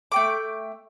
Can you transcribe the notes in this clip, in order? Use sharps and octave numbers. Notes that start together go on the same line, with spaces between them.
A3 G5 D6